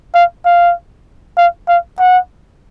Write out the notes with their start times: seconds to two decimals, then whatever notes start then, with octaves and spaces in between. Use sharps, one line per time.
0.15 F5
0.45 F5
1.37 F5
1.68 F5
1.99 F#5